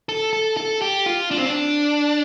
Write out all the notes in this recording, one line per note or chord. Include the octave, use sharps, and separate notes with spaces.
A4
A4
A4
G4
F4
D4
C4
D4